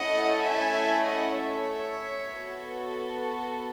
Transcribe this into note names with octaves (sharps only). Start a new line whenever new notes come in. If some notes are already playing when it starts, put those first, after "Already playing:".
Already playing: A3 C#4 E4 A4 D#5 F#5
E5 G#5
D#5 F#5
C#5 E5
B3 F#4 A4